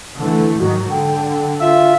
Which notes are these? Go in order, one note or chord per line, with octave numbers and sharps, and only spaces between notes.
D3 E3 A3
G#2 D#3 F#3 F#4
D3 G5
F4 E5